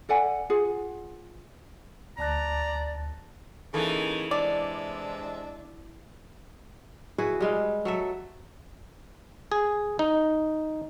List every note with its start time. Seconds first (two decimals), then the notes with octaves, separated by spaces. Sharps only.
0.09 A4 D5 F#5 G#5
0.50 F4 G#4 F#5
2.19 D2 D5 A5 A#5 F#6
3.74 C#3 E3 A#3 D#4 A4
4.31 C3 G#3 D4 D5 E5
7.18 E4 F#4 G#4 B4
7.40 G3 G#3 F5
7.85 F#3 A4 E5
9.52 G#4
9.99 D#4